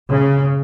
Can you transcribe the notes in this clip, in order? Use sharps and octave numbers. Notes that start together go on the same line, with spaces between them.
C#3